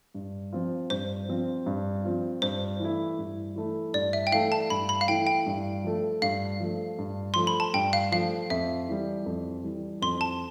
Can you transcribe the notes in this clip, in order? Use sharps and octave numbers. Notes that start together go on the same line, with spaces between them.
G2
F3 C4 F4
G2 C5
F3 C4 F4
G2
F3 C4 F4
G2 C5
E3 A3 E4
G2
E3 A3 E4
G2 D5
E5
G5
E3 A3 E4 F5
A5
G2 B5
B5
F5
E3 A3 E4 G5
G5
G2
F3 A3
G2 F5
F3 A3
G2
F3 A3 C6
B5
A5
G2 G5
F5
F3 A3 F5
F2 E5
E3 G3
F2
E3 G3
F2 C6
A5